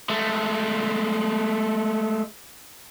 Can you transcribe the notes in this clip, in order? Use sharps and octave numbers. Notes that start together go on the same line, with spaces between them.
G#3 A3